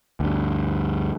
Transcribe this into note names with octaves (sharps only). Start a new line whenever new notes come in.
D2 G2